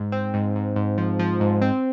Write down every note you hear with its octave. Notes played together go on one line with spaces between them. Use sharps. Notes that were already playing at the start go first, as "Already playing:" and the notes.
Already playing: G#2
C4
G#2
G#2
G#2
F3
F3
G#2
C4